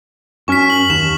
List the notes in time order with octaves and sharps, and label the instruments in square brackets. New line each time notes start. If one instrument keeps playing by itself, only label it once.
[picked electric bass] F#2 C#4 [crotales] C#6 F6 B6
[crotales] F#7
[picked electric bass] D#2 [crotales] E7